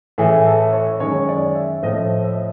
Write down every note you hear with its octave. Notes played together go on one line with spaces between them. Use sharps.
A2 E3 A3 G#4
A4
C#5
F#2 D#3 G#3 C#5
D5
E5
A2 F3 A3 D#5
E5